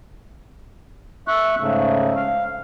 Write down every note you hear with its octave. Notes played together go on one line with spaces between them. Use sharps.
E5 C#6 F#6
G#2 C#3 A3
F5